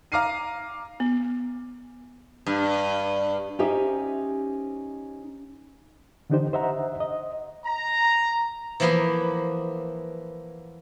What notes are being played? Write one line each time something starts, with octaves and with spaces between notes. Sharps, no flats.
F5 A#5 D6 F6 C7 D#7
B3
G2
C#4 D#4 G4 C5 E5
D3 E3 D4 D#4 G4 C5
C5 D#5 E5 F#5 A#5
D#5
A#5
E3 F3 A#3 B3 A#4 B4